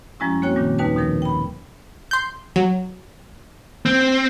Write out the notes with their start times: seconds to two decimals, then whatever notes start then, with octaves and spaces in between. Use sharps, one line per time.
0.20 F#2 F3 G3 G#3 C#4 E4
0.42 A#3 C4 F#4 C#5 G5
0.56 A#2 D#3 G3
0.78 D#2 D#4 B4 A5
0.96 B2 D#3 F3 A#4
1.22 G5 B5
2.11 C6 G6
2.56 F#3
3.86 C4